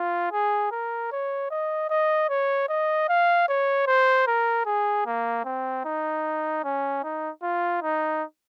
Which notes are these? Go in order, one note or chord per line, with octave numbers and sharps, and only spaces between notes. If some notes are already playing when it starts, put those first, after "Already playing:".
Already playing: F4
G#4
A#4
C#5
D#5
D#5
C#5
D#5
F5
C#5
C5
A#4
G#4
A#3
C4
D#4
C#4
D#4
F4
D#4